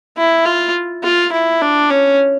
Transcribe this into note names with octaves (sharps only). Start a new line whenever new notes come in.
E4
F4
F4
E4
D4
C#4